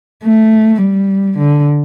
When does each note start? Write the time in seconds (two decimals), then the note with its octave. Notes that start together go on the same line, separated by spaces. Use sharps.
0.24 A3
0.81 G3
1.38 D3